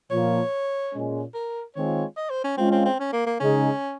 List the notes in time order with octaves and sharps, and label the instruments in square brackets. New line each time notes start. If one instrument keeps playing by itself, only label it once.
[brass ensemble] A#2 F3 A#3 [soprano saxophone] C#5
[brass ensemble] A#2 G#3 C#4
[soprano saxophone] A#4
[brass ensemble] D#3 G#3 C4 F4 [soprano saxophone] C#5
[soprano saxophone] D#5
C5
C#4
[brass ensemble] G#3 C#4 F4 [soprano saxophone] C4
[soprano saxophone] C4
C4
C#4
A#3
A#3
[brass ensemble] C#3 G#3 D#4 G#4 [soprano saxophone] C#4